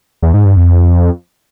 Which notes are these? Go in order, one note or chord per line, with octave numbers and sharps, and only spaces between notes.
E2
G#2
G2
F2